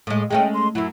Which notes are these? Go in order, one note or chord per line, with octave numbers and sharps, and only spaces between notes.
A2 G#3
G#3 A3 C#4 G5
C6
F#2 F#3 E4